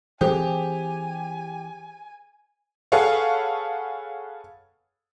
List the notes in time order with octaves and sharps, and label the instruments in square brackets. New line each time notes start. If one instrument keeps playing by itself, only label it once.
[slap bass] E3 C4 [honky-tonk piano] G4 [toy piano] G#4 C5 D#6 [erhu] G#5
[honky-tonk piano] G#4 A4 B4 C#5 F5 F#5